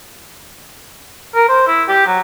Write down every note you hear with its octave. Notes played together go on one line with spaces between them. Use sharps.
A#4
C5
E4
G4
F#3